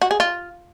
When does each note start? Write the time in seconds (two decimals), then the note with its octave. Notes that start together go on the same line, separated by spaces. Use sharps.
0.02 F#4
0.11 G#4
0.20 F4